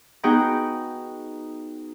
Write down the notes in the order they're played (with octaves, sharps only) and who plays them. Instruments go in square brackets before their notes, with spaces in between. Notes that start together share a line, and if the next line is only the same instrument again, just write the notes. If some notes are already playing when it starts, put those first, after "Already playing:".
[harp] B3 D#4 F#4 G#4 G5